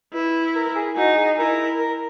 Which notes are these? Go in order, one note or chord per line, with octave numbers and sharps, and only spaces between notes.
E4 B4
A#4
G#4
D#4 F#4
G#4
E4 A#4
A#4